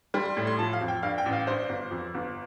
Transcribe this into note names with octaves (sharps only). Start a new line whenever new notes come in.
G3 C6
C6
A2
C6
F3 A5
F5
F2
G5
G2 F5
G5
A1
F5
G2 C5
G1
F2
G1